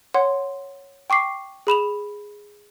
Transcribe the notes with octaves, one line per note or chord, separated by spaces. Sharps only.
C#5 F#5 C6
G5 C#6 D6 C7
G#4 B5 E7 F7